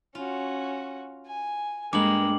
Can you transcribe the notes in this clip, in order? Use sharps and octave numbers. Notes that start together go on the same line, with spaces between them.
C#4 F4 F#4
G#5
G2 G#3 A#3 D6 F#7